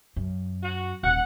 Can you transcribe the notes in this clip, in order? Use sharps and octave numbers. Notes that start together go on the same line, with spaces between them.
F#2
F#4
D#1 F#5